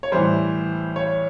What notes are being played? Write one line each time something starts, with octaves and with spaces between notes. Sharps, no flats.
C#5
A2 E3 G3 C5
C#5